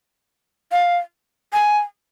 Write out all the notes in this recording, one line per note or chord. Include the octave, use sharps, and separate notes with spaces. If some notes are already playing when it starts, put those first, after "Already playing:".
F5
G#5